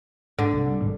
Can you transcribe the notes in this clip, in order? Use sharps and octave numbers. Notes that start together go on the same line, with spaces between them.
G#2 D3
C2
G3
G#1 G#2 G3